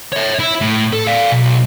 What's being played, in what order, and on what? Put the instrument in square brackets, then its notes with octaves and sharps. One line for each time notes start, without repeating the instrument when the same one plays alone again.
[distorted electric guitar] C#5 E5
E4
A2
A4
D5 F5
B1